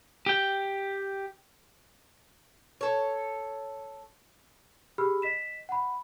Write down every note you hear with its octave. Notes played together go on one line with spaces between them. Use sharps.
G4 G5
A4 C#5
G4 G#4 B5 E6 F6
D#5 B6 E7
F#5 B5